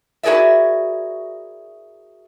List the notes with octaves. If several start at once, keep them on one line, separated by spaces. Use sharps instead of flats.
E4 F#4 G#4 A#4 D5 E5